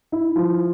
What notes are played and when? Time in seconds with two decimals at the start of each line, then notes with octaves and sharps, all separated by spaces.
0.12 E4
0.36 F3